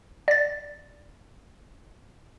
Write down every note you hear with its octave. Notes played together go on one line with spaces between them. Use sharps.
D5 A6